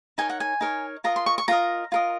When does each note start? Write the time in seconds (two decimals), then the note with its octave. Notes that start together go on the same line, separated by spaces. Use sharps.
0.18 D#4 A#4 C#5 G#5
0.30 F#5
0.40 G#5
0.61 D#4 A#4 C#5
1.04 F4 A#4 D#5 A#5
1.16 C6
1.26 C#6
1.38 C#6
1.48 F4 A#4 D#5 A#5
1.92 F4 A#4 D#5